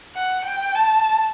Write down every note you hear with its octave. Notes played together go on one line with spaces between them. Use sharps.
F#5
G5
A5